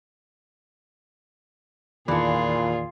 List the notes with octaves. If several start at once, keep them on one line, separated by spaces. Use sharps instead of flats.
E2 A#2 D#3 E3 F4 G#4 A4 D5